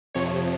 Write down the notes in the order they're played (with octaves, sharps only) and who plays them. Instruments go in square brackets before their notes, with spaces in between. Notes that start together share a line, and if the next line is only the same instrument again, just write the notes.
[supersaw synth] F2 C3 F3 C#5